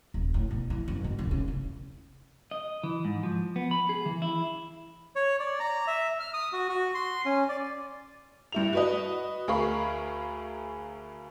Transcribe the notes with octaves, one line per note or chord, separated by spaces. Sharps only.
D#1
A2
B2
E3
F#1
G#2
D#1
C#3
F4
D#5
E3
G#2
F3
B3
B5
G#4
E3
E4
C#5
D5
A#5
E5
F6
D#6
F#4
F#4
C6
C#4
D5
G2 E4 F7
F#4 B4 D#5
D2 G#4 A#4 F5 B5 C#6